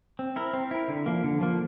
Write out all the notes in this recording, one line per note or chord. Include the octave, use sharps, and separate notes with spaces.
C4
E4 A#4
C4
E4 A#4
D3
F3 A#3
D3
F3 A#3